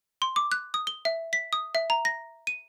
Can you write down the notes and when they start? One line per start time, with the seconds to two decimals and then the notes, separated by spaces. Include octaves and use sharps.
0.22 C6
0.36 D6
0.52 F#6
0.74 D#6
0.87 G7
1.05 E5
1.33 B6
1.53 D#6
1.75 E5
1.90 A#5
2.05 A#6
2.47 D#7